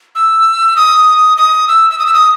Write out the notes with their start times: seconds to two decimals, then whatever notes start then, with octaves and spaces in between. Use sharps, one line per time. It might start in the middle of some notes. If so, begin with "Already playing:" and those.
0.15 E6
0.76 D#6
1.37 D#6
1.68 E6
1.90 E6
1.99 D#6
2.06 E6
2.14 D#6